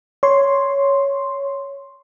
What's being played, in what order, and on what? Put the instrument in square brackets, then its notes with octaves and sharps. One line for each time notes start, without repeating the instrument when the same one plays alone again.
[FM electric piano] C#5 C6